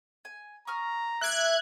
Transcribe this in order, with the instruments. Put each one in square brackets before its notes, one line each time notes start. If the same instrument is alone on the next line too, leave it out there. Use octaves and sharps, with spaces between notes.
[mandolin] G#5
[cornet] A#5 [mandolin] C#6 D#6 F6
[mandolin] A#3 E5 [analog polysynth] F#6 G#6